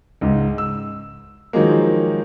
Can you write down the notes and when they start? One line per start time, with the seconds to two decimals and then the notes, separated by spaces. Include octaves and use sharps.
0.21 C#2 G#2
0.58 E6
1.53 D#3 F3 F#3 G#3 A#3